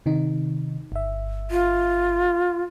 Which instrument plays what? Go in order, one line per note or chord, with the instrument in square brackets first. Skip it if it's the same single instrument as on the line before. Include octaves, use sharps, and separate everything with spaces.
[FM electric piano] C3 D#3 D#4
G1 E5
[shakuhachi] F4